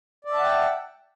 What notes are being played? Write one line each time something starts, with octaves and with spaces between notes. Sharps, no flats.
D5 E5 F#5 G5 A5